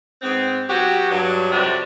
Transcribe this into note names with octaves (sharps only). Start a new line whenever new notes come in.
G#2 B3 C4
F#3 B3 F#4 G4
G2 F#3
F2 C3 D4 F#4 G4